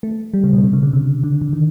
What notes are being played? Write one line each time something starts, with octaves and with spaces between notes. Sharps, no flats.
A3
G3
C#3
B2
C3
C#3
D3
C3
D3
D3
D#3